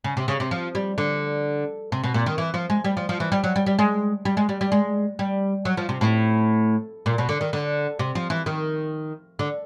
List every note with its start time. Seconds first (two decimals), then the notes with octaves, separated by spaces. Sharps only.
0.04 C#3
0.17 C3
0.28 C#3
0.40 C3
0.51 F3
0.75 G3
0.98 D3
1.92 C3
2.04 B2
2.14 A#2
2.26 D#3
2.38 E3
2.54 F3
2.70 G#3
2.84 G3
2.97 F3
3.09 F3
3.20 E3
3.32 G3
3.44 F#3
3.56 G3
3.66 G3
3.79 G#3
4.25 G3
4.37 G#3
4.49 G3
4.61 G3
4.72 G#3
5.19 G3
5.65 F#3
5.77 F3
5.89 C3
6.01 A2
7.06 A#2
7.18 B2
7.29 D3
7.41 D#3
7.53 D3
7.99 C3
8.15 F3
8.30 E3
8.46 D#3
9.39 D3